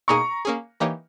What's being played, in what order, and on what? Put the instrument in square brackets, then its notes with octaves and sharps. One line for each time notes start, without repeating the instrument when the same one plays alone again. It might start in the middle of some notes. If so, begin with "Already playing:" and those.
[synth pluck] B2 A#3 D#4 G#4 D#5 [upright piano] A#5 C#6
[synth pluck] A#3 C#4 G#4
E3 A#3 D#4 G4 C#5